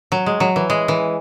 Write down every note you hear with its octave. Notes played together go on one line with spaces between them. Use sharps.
F#3
G#3
F#3
E3
G#3
E3